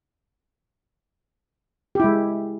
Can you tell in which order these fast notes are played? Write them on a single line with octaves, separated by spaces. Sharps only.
G4 E4 G#3